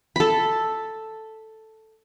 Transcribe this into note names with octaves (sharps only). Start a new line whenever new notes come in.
A4 B5